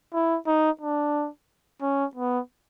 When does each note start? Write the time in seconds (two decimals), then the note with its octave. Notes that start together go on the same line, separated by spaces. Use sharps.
0.14 E4
0.47 D#4
0.81 D4
1.82 C#4
2.16 B3